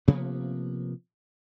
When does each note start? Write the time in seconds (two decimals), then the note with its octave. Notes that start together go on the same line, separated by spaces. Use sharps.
0.08 C3 F3 A#3 B3